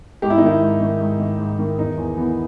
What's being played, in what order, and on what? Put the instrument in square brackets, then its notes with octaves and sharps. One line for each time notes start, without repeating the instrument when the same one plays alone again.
[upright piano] G#2 G4
E4
D#4
D#3 E4
G#2
D#3
G#2
D#3
G#2
D#3
E2 D#4
E2
E3 B3